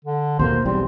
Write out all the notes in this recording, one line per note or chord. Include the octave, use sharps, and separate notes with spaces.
D3
D#2 B2 A#3 C5
B1 E2 G3 C4